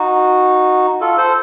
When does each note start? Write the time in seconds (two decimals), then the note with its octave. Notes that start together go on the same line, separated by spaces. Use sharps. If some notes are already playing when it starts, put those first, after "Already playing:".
Already playing: D#4 F#4
1.01 F4 A4
1.17 A4 C5